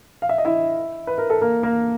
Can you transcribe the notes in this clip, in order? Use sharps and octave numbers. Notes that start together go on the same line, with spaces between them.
F5
E5
D#5
E4 E5
B4
A#4
A4
A#3 A#4
A#3 A#4